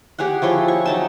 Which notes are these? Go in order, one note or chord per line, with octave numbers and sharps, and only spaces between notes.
G4 G#4 C#5 F#5
F3 E4 C#5 C6
C#6
F#3 D#4 A5